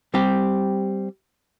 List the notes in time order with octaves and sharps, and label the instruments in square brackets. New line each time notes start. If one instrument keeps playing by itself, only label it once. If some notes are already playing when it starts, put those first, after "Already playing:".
[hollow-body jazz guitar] G3 C4 G4